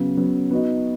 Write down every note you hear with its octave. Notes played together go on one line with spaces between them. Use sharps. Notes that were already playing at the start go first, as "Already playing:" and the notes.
Already playing: C#3 F#3 B3
C#3 F#3 B3
B3 D#4 F#4 D#5